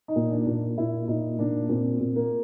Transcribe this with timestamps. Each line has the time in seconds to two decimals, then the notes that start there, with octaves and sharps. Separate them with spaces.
0.08 D#4
0.16 A#2
0.31 D4
0.46 A#2
0.78 A#2 E4
1.08 A#2 D#4
1.39 A#2 D4
1.69 A#2 C4
2.00 A#2
2.16 A#3